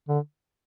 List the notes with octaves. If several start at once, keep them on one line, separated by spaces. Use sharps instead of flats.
D3